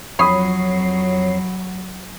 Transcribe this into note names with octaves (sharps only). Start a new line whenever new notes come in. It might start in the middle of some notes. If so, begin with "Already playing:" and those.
F2 F#3 C#5 B5 D#6 C7